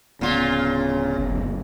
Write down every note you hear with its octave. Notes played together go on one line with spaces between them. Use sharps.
D1 A#2 C#3 B3 F4
F#1